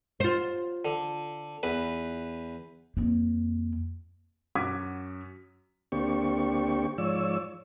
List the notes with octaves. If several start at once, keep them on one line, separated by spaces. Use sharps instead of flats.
F4 C5
D3
E2 B4
F2 A#3
F#2 F#4 D6 D#6 G#6 B6
D2 A#3 C4 D4 G4 C#6
G#2 F3 C#5 D5 E6